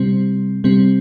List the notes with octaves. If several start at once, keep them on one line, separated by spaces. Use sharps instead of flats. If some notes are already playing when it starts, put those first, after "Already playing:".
Already playing: C3 G3 C4
C3 G3 C4